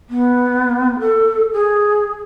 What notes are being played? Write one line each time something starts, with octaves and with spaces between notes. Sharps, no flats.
B3
A4
G#4